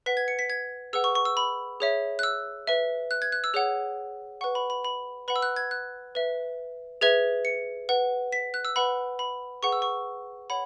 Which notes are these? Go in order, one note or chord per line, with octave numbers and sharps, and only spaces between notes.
B4 F#5 B6
G#6
C#7
B6
G#6
G#4 B4 F#5 E6
C#6
C#6
E6
B5
G#4 C#5 E5
F#6
E6
B4 E5
F#6
G#6
F#6
E6
G#4 C#5 F#5
B4 F#5 C#6
B5
B5
B5
B4 F#5 B5
E6
F#6
G#6
F#6
B4 E5
G#4 B4 E5 G#6
C#7
B4 F#5
B6
F#6
E6
B4 F#5 B5
B5
G#4 B4 F#5 C#6
E6
C#6
C#5 F#5 B5